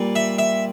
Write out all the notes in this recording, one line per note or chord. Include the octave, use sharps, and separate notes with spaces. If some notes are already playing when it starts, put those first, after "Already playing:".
Already playing: A#2 G3 A#3
E5
E5